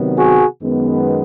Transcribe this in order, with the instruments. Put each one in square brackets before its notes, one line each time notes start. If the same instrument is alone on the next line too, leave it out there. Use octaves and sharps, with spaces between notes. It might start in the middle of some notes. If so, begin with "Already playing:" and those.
Already playing: [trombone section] C3 D#3 F#3 B3
F#4 G#4
F#2 D#3 G#3 B3